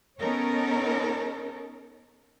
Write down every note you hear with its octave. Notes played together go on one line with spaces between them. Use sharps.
B3 C#4 D#4 A4 A#4 C#5